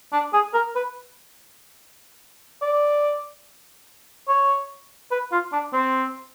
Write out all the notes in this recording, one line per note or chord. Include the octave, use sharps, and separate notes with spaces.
D4
G#4
A#4
B4
D5
C#5
B4
F4
D4
C4